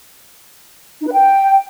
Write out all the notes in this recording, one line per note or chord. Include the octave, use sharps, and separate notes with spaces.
D#4
B4
G5